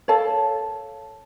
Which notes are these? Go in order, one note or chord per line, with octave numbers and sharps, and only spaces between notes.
A4 C#5 F5 A5